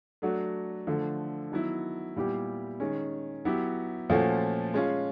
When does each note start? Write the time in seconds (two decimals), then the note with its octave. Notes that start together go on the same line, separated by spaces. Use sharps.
0.22 F#3 A3 D4 F#4
0.87 D3 F3 A3
1.51 D#3 F#3 B3 E4
2.16 A#2 G3 B3 E4 G4
2.80 D#3 G#3 C#4
3.45 F#3 B3 E4 G4
4.10 A#2 F3 A3 C#4 F#4
4.74 G#3 C#4 F4